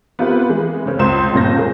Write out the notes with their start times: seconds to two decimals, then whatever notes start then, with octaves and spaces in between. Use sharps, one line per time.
0.19 B3 C4 F4 G4 A#4 B4
0.49 E3 G#3
0.86 C#3 C4 C#4
0.99 C#2 C5 C6 E7
1.33 G1 F2 A#2 C#3 G6 A#6
1.58 G#4 A#4